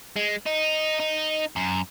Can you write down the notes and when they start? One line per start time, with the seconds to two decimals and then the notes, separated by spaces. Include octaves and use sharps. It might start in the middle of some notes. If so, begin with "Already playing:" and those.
0.16 G#3
0.46 D#4
0.99 D#4
1.56 F#2